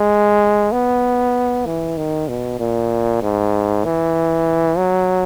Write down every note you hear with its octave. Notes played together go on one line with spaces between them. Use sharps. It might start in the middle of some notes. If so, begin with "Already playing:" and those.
Already playing: G#3
B3
E3
D#3
B2
A#2
G#2
E3
F#3